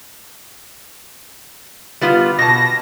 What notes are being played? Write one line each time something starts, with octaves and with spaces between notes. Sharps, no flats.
G3 B3 F4
B2 A5 A#6